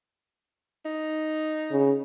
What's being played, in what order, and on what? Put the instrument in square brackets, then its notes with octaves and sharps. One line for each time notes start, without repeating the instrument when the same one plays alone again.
[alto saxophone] D#4
[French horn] C#3